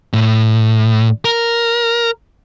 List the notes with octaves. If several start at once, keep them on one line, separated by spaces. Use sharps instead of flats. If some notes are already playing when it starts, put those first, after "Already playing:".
A2
A#4